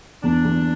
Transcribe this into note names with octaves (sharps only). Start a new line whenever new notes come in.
E2 D4
E2